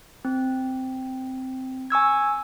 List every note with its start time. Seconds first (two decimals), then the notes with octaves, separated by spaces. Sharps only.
0.25 C4
1.90 G#5 C#6 E6 G#6